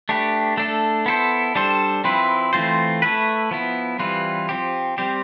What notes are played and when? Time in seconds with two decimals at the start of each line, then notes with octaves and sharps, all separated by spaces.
0.09 A3 D4 G4 B4
0.57 A3 D4 A4
1.06 B3 E4 A4 C5
1.55 G3 D4 A4 C5
2.04 F3 C4 E4 B4
2.53 E3 A3 C4 F4 C5
3.02 A3 E4 B4
3.51 F3 B3 E4
3.99 E3 G3 C4 F4 B4
4.49 F3 C4 G4
4.98 G3 C4 G4